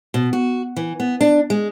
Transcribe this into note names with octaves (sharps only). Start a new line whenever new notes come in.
B2
F#4
E3
B3
D4
G#3